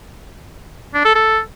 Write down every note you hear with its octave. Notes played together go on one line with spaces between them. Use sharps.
D4
A4
A4